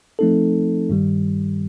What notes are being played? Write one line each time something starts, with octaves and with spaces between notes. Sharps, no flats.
F3 A3 C4 D#4 A4
G2 D#3 G3